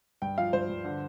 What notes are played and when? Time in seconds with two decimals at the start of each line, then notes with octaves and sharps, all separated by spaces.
0.22 G2 G5
0.38 F3 F5
0.53 G2 C5
0.69 G2
0.84 D3